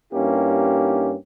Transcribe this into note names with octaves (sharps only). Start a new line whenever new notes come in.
G2 A#3 C#4 D#4 E4 G4